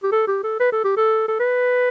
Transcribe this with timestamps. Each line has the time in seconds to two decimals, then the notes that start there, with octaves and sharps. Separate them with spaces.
0.03 G4
0.12 A4
0.27 G4
0.44 A4
0.60 B4
0.72 A4
0.84 G4
0.97 A4
1.28 A4
1.40 B4